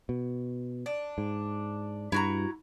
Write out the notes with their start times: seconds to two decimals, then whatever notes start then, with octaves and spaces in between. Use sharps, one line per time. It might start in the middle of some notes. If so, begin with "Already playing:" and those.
0.09 B2
0.86 D4
1.18 G#2
2.12 G2 E4 F#4 A#5